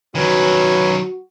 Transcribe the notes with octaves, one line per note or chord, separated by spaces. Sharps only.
D#3 F#3 C#4 F#4 B4 G#5